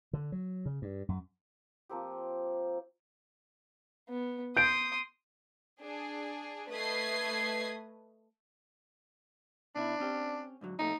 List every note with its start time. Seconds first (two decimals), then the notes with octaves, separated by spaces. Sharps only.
0.13 D3
0.32 F#3
0.66 C#3
0.82 G2
1.09 F#2
1.89 F3 A#3 C4 G4
4.08 B3
4.57 C6 D#6 G6 D7
5.80 D4 G#4
6.70 A3 B4 D#5 D#6 G#6 C7
9.76 B2 C#4 D4 E4
10.00 C4 C#4 G4
10.61 G#2 D3 F#3
10.79 F2 A#2 A3 D#4